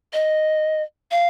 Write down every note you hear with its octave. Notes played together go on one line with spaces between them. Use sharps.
D#5
F5